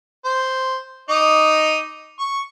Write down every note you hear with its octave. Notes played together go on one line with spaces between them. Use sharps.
C5
D#4 D#5 D6
C#6